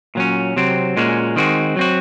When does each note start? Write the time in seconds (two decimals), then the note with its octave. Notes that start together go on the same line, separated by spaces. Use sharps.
0.15 A#2 F#3 C#4
0.56 C3 F#3 C4
0.97 A#2 G#3 C#4 F#4
1.36 D#3 G#3 C4 F#4
1.77 F#3 C4 F#4